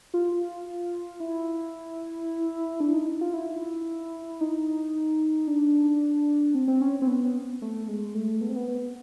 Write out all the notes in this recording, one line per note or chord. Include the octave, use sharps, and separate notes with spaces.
F4
E4
D4
D#4
F4
E4
D#4
D4
C4
C4
C#4
C4
B3
A3
G#3
A3
B3
C4
B3
B3